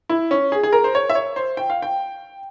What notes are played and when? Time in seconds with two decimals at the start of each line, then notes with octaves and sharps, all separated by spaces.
0.09 E4
0.31 C#4
0.52 G#4
0.63 G#4
0.73 A#4
0.84 C5
0.95 C#5
1.10 E5
1.15 C#5
1.36 C5
1.57 G5
1.70 F5
1.82 G5